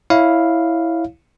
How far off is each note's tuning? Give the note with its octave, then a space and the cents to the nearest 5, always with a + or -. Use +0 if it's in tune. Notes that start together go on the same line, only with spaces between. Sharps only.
E4 -5 C#5 +0 F5 +0